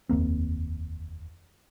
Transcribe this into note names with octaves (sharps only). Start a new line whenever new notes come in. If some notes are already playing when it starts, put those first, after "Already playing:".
F1 D#2 A#3 C4